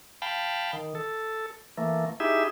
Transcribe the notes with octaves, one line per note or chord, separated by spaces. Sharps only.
F5 G5 A5 B5
D#3
A4
E3 A3 A#3
D#4 E4 G4 G#4 E5